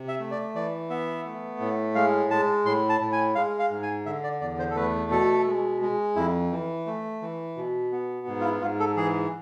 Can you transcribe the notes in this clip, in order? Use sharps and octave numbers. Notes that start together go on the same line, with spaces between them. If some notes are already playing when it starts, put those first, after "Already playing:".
Already playing: C3
E5
A3
D5
E3 D5
B3 E5
A3
A2
G#3 F5
G#3 A5
A2 C6
A5
A2
G#5
G#3 F5
F5
G#2
G#5
D3 E5
D5
E2 D5
C5
A4
A3 B4
B2 A4
G#3
G#3
F2 E4
E3
A3
E3
B2
B3
G#2
F4
E4
G#2 F4
A4
E3 G#4